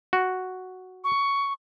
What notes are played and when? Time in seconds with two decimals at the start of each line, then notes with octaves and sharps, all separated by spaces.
0.13 F#4
1.04 C#6